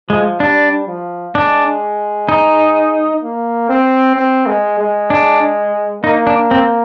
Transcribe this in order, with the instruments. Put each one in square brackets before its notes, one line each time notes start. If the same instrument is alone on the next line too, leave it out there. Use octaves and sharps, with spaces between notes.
[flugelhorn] F3 [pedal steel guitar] G#3
[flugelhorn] G3 [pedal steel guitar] D4
[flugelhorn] F3
[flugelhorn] G#3 [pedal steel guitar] D4
[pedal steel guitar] D#4
[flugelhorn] A#3
C4
C4
G#3
G#3
[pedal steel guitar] D4
[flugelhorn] A#3 [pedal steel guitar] D#4
[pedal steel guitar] D4
C4